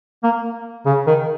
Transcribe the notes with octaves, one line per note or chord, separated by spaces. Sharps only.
A#3
C#3
D#3